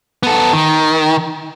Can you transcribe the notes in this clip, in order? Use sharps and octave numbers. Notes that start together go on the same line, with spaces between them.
B3 A4
D#3